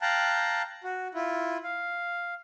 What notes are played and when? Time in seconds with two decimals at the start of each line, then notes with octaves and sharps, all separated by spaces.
0.02 F5 G5 A5 A#5 F#6
0.84 F#4
1.15 E4 F4
1.63 F5